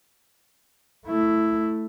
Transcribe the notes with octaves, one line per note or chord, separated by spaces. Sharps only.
A3 E4